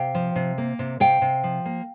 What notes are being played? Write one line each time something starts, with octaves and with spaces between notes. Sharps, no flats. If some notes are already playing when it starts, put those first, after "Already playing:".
Already playing: C3 F5 G5
F3
C3
A#3
C3
C3 F5 G5
C3
F3
A#3